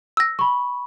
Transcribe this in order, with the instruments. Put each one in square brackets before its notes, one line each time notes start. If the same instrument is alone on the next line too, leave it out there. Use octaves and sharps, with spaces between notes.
[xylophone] E6 A#6
[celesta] B5 C#6